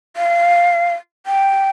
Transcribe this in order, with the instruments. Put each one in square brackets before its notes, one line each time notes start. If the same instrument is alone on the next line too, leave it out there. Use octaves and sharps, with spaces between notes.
[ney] F5
G5